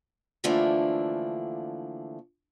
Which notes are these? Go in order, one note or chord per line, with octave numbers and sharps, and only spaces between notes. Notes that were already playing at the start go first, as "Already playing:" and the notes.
D3 E3 F3 A3 A#3 D4